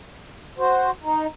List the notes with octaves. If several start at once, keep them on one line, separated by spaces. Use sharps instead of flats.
F#4 C5
D#4